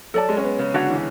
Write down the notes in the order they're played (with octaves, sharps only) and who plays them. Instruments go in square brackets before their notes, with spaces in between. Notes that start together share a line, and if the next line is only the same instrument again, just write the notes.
[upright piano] F#3 [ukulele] A4 D5 A5
[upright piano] G#3
C#4
B3
C#3
[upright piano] D3 [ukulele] D4 F#4 C#5 F#5
[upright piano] E3